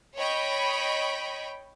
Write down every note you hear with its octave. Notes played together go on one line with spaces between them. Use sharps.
C#5 D#5 G5 B5